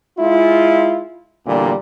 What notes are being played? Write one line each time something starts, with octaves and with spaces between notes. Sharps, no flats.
G#3 E4 F4
E2 A#2 D3 G3 A#3